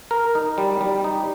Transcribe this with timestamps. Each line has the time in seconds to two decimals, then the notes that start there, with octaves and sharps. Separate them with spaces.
0.11 A#4
0.35 D#4
0.58 G3
0.81 G3
1.04 D#4